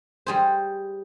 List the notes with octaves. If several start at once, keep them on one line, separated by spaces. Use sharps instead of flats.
G3 G#4 C5